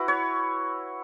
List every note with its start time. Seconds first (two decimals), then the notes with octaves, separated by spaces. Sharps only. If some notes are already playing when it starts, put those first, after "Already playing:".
Already playing: E4 F#4 B4
0.08 C#5